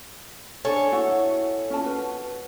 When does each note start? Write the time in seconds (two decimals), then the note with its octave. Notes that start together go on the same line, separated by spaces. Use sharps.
0.65 D4 G#4 A4 C#5 G#5
0.92 E4 F#4 F#5
1.70 C#4 F4 A5
1.84 F#4 B4